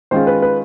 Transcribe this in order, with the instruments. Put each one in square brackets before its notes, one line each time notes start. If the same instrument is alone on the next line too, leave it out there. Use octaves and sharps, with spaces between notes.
[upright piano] D#3 G#3 C#4 F4 C5
B4
B4